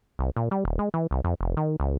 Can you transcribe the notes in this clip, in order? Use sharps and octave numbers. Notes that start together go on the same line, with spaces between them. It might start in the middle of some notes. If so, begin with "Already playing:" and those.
C2
A#2
G3
D#1
G#3
E3
C2
F2
F1
D#3
C#2